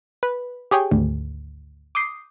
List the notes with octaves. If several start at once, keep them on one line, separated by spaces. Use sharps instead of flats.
B4
G4 G#4 C#5 G5
G#1 D2
D6 D#6 G6 C7